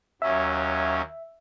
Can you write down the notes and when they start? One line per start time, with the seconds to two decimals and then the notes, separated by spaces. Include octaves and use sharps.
0.22 D#2 F#3 C#4 E5